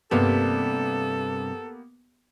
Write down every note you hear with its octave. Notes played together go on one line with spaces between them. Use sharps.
G2 C3 A#3 B3 G4 A4